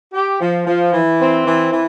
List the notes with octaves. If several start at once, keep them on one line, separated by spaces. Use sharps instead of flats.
G4
F3
F3
E3
C4
E3
E3